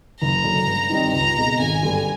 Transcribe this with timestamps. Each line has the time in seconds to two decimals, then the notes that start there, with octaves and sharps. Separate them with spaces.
0.21 F#1 A#5
0.44 F#2 D3
0.67 G2
0.90 D#3 G3 C4 D#4
1.13 C#2 A#5
1.36 B2 G#3
1.59 G#1 G#5
1.82 G2 D3 G3